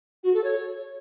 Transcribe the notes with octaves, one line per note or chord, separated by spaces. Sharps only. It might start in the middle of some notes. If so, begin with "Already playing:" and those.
F#4
A4
C#5